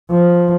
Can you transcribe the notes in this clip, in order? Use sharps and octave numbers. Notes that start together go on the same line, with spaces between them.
F3